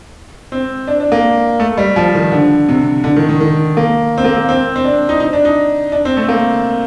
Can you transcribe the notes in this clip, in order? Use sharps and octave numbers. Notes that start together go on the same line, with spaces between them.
C4
D4
D4
A#3
A3
G3
F3
D#3
D3
C3
D3
D#3
D#3
D#3
A#3
C4
A#3
A#3
C4
C4
D4
D#4
D#4
D4
D#4
D4
C4
A3
A#3